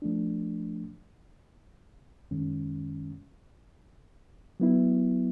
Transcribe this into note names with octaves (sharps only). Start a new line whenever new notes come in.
F3 A3 D4
F#2 D#3 G#3 C#4
F#3 B3 E4